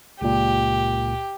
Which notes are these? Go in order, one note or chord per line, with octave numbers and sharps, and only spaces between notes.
C#2 A#2 G4